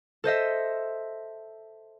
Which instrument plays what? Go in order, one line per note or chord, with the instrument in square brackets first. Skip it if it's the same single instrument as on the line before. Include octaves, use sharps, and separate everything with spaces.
[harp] A4 C5 D#5 E5